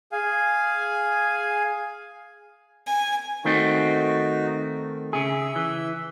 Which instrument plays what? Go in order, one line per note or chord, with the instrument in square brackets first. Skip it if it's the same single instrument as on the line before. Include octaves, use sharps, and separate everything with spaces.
[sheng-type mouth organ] G#4 F5 G#5
[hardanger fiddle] G#5
[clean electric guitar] D#3 A3 C4 [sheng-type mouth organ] D#4 F#4
[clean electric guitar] C#3 G#4 [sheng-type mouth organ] E5
[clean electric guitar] E3